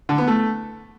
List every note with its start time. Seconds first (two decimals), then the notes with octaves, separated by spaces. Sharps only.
0.09 D3
0.18 B3
0.27 A3